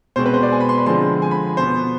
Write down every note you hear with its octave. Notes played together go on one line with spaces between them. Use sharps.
B2 G#3 C4 C5
B4
C5
D5
G#5
B5
C6
B5
D3 F3 G#3 C4 C6
G#5
B5
B2 B3 C5